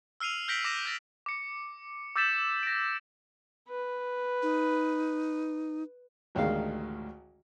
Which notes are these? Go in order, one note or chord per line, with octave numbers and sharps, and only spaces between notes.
E6 F6 C7 D#7 F7
F6 G6 A#6 B6 D7 F#7
D6 A#6 C7 E7
E6 G6 A6 A#6
D6 C#7
D6 E6 G6 A6 B6 E7
A#6 D7
B4
D#4
A1 D2 D#3 G#3 F5